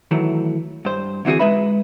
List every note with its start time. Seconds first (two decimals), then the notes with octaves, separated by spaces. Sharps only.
0.11 D#3 E3 F#3 A3
0.85 G2 C5
1.25 D3 E3 C4 F#4 G#4
1.39 G#3 D#4 B4 E5 B5